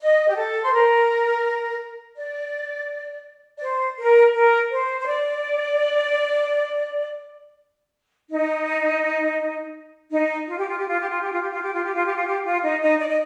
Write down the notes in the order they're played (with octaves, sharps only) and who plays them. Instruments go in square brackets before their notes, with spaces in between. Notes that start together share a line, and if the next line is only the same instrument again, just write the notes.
[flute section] D#5
G4
A4
C5
A#4
D5
D5
C5
A#4
A#4
C5
C5
D5
D#4
D#4
F4
G4
F4
G4
F4
G4
F4
G4
F4
G4
F4
G4
F4
G4
F4
G4
F4
G4
F4
D#4
D#4
D5
D#5